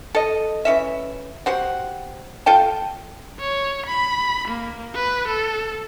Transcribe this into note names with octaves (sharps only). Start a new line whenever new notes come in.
A4 D#5
E3 C#4 E5
F#4 G4 C5 F#5
F4 A4 G5 A5
C#5
B5
A#3
B4
A4